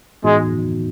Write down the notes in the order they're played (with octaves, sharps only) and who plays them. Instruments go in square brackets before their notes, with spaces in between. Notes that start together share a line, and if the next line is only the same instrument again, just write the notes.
[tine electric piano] A2 E3 B3 D#4 F#4 [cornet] G#3